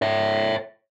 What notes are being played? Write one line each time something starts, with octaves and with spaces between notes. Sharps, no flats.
C#5 E5